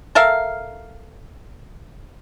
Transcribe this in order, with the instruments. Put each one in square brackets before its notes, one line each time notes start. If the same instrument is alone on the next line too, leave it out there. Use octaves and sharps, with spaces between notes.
[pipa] A4 A#4 E5 F5